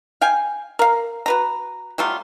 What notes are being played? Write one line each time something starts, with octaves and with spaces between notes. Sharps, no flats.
F5 G5 G#5
A#4 F5
F#4 B4 A#5
F#3 G3 A3 F4